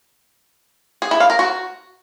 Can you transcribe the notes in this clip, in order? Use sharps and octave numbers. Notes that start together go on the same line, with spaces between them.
G#4
E4
F5
A#4
F#4